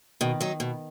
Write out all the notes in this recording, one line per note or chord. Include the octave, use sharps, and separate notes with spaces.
B2 D#3
F#3 D#4
B2